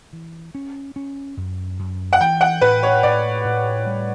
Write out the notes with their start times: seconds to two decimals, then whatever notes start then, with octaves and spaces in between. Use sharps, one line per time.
0.13 E3
0.55 C#4
0.96 C#4
1.37 F#2
1.79 F#2
2.13 F#5
2.20 E3 G5
2.41 F#5
2.61 A2 B4
2.83 C#5
3.03 A2 D5
3.45 A2
3.86 G3